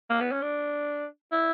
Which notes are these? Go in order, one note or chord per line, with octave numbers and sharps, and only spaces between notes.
A#3
B3
C#4
D4
E4